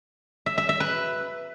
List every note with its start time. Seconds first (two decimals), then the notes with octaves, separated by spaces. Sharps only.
0.46 E5
0.58 E5
0.69 E5
0.80 B4